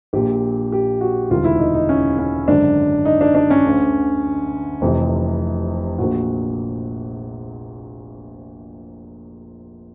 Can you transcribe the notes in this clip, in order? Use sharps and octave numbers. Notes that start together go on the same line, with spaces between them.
A#1 A#2 G4
G4
F#4
E1 D2 C3 D#3 F4
E4
D#4
D#4
C#4
C#4
G#1 F#2 D3 D4
D#4
D4
D4
C#4
D2 D3
F1 F2 C3 E3
A#1 A#2 F#4